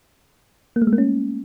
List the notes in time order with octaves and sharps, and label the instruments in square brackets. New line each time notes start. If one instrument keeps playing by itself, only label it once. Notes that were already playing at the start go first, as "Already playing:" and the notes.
[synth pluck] A#3
A3
G#3
A#3
C#4